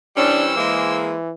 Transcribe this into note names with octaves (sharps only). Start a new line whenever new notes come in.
E3 G3 C#4 D4 C5 E6
E3 G#3 A#3